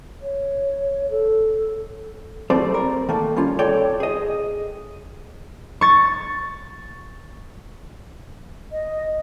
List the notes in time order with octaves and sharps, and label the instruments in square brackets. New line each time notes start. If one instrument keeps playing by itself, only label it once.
[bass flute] C#5
A4
[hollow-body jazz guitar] F#3 G3 A3 C4 D5
A#4
D#3 A3 A#3 A4
G3 C#4 F4
A4 C#5 D5 G5
G#4 D#5
[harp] C#6 A6
[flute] D#5